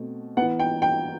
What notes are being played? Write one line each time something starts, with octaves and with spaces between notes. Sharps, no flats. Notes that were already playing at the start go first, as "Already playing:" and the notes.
Already playing: B2 A3 C4
E3 B3 F#5
G5
G5